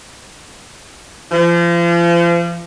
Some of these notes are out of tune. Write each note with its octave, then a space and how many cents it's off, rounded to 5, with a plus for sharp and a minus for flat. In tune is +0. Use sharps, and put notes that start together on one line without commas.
F3 -35